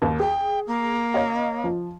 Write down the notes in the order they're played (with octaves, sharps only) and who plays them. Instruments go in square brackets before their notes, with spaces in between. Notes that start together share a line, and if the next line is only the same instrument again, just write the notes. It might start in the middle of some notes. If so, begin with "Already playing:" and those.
[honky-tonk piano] D#2 A#3
[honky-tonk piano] G#4 [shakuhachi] G5
[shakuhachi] A#3
[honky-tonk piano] C#5 D#5 F5
F3